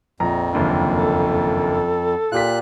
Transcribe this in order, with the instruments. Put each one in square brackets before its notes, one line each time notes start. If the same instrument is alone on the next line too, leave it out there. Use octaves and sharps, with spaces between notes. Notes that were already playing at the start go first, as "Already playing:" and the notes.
[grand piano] A#1 A#5 [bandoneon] F2
[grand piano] F#1 D#2 D3
[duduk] A4
[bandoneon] A#2 F#6 [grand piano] F4 G4 B6